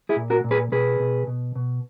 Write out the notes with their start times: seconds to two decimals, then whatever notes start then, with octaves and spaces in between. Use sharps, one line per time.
0.09 E4 G#4
0.16 A#2
0.30 F#4 A#4
0.44 A#2
0.51 G#4 B4
0.72 B2 G#4 B4
1.00 B2
1.27 B2
1.56 B2